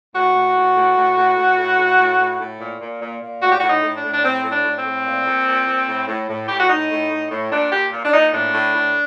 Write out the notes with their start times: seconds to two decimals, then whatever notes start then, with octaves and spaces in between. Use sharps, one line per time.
0.15 A2 F#4
0.36 A2
0.57 A2
0.77 A2
0.97 A2
1.18 A2
1.38 A2
1.58 A2
1.79 A2
2.00 A2
2.20 A2
2.40 A2
2.61 A#2
2.81 A#2
3.02 A#2
3.22 A#2
3.43 A2 F#4
3.52 G4
3.60 A2 F#4
3.70 D#4
3.84 A2
3.97 D4
4.04 A2
4.14 D4
4.25 A2 C4
4.45 A2
4.52 D4
4.65 A2
4.79 C4
4.86 A2
5.07 A#2
5.27 A#2
5.48 A#2
5.68 A#2
5.89 A2
6.08 A2
6.30 A2
6.48 A2 G4
6.59 F#4
6.70 A2 D#4
6.91 A2
7.11 A2
7.31 A2
7.52 A#2 D4
7.72 A#2 G4
7.93 A#2
8.05 D4
8.13 A#2 D#4
8.34 A2 D4
8.54 A2
8.75 A2